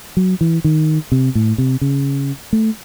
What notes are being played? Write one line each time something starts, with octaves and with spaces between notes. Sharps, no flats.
F#3
E3
D#3
C3
A2
C3
C#3
A3